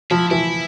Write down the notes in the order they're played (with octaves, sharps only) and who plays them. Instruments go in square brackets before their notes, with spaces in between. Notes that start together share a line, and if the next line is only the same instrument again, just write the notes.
[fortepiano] F3 [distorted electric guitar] E4
[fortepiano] E3 [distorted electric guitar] E4